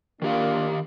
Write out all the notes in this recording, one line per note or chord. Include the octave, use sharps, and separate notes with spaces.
D#3 A#3 D4 F4 G4 F5